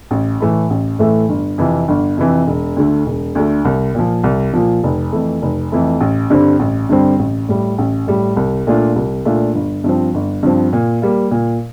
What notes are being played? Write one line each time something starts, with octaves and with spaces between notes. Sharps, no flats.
A1
A2 E3 A3 E4
A1
A2 E3 A3 E4
G1
F2 C3 E3
G1
F2 C3 E3
E1
D2 D3 A3
E1
D2 D3 A3
C2
A#2 F3
C2
A#2 F3
F1
F2 E3 A3
F1
F2 E3 A3
A1
G2 D3 G3 C4
A1
G2 D3 G3 C4
A1
A2 G3
A1
A2 G3
C2
A#2 A3 D4 F4
C2
A#2 A3 D4 F4
G1
G2 F3 C4
G1
G2 F3 C4
A#2
G3 A#3
A#2